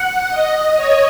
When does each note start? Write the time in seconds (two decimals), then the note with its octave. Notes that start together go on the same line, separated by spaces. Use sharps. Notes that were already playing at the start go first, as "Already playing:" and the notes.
Already playing: F#5
0.29 D#5
0.76 C#5